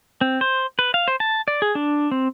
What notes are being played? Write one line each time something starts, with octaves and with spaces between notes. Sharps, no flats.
C4
C5
B4
F5
C5
A5
D5
G#4
D4
C4